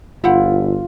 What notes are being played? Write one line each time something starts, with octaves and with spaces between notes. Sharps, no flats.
G1 E4 F4 C5 F#5